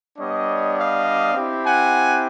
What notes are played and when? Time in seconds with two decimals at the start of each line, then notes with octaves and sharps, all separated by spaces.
0.17 G3 B3 D4 C#5 D#5
0.76 D#5 F5
1.34 C4 E4 G4
1.64 F#5 G#5